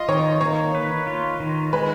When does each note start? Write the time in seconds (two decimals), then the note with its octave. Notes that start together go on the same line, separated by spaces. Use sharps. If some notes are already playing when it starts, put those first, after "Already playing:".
Already playing: F4 D#5
0.08 D#3 C#5
0.41 A#3 C#5
0.75 B4
1.07 F4
1.40 D#3
1.73 G#3 B4